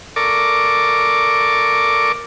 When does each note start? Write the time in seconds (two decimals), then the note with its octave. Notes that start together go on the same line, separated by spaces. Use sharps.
0.16 A4 A#4 D5 C#6 D6